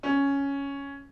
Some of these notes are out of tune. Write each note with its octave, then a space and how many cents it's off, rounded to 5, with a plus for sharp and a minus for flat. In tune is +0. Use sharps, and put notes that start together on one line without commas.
C#4 +5